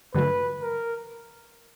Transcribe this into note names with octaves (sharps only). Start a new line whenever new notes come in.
G2 D3 F#3 A3 B4
A#4